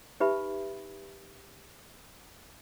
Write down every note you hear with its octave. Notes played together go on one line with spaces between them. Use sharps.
D#4 G4 B4 E5 B5